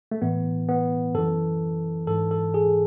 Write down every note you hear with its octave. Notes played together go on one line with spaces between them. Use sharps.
A3
A2 E3 B3
B3
F#2 E3 A4
G#2 E3 A4
A4
G#4